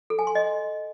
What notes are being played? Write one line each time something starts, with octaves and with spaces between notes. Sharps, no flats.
A4
G#5
C6
D#5